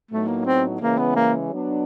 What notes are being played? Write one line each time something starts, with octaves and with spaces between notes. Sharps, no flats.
A2 F#3 A3 B3 D#4
A#3
C4
C#3 E3 G#3 A#3 C#4
B3
A#3
F#3 B3 D4